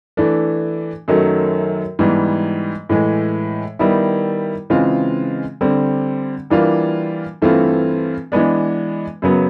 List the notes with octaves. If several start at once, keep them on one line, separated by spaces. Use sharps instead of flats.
E3 A3 D4
F#2 D#3 F#3 A3
G#2 E3 G3 B3
A2 E3 G#3
D#3 G3 B3 E4
C#3 E3 G#3 C4 F4
D3 G3 C4
E3 G3 A#3 D4 F4
G2 E3 A3 C4 F4
E3 G#3 B3 D4
F#2 C#3 F#3 B3